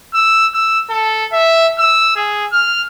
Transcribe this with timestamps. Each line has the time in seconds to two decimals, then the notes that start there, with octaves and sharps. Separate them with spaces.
0.14 E6
0.54 E6
0.90 A4
1.33 E5
1.79 E6
2.16 G#4
2.52 F6